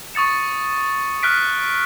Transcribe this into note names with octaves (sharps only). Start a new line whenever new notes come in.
C#6 D#6 A6 C#7 E7
F6 F#6 B6 D7